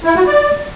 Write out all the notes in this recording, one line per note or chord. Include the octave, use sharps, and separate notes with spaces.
E4
F#4
D5